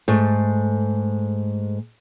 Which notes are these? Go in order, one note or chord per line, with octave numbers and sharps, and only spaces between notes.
G#2 A3